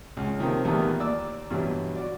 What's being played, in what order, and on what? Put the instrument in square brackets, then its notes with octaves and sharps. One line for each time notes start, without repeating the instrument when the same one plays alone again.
[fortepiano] C#2
C3 D#3 F3 A#3 C4
E2 A#2 D#3 E3 G3 A3
D#2 D5 E6
G2 B2 E3 F#3
F#4 D5